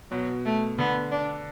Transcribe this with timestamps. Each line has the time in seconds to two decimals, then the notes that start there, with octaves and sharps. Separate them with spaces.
0.11 B2 F#3
0.45 A3
0.78 D3 B3
1.11 D4